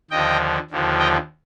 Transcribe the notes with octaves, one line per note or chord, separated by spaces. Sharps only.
D#2 D3 F3 D#5 G5
D#2 D3 F3
D#5 G5